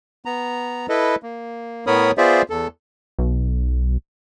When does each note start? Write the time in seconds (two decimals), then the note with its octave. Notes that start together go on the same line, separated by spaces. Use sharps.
0.25 B3 A#5
0.89 E4 A4 B4 D#5
1.23 A#3
1.87 A2 B3 A#4 C#5 B5 D#6
2.18 B3 F4 G#4 C5 D5 E5
2.50 E2 A4
3.18 B1